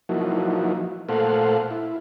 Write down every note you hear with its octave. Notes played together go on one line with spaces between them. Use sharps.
F3 F#3 A#3 D#4 E4 F#4
A#2 A3 A4 C5 F5 F#5
E4